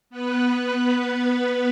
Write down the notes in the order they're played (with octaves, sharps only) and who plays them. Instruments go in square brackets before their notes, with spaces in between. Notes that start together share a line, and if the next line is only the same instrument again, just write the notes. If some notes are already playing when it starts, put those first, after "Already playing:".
[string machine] B3 B4